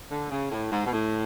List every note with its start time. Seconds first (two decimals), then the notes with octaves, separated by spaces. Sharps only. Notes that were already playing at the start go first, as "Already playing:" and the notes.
0.09 D3
0.30 C#3
0.50 A2
0.70 G#2
0.85 B2
0.91 A2